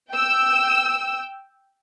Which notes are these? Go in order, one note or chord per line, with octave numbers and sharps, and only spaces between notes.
G5 E6